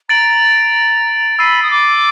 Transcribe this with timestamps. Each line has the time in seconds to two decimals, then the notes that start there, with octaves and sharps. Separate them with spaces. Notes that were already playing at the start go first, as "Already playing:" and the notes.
0.09 A#5 A6 D7 F#7
1.38 B5 E6 A6 C7 D#7
1.63 D#6
1.71 D6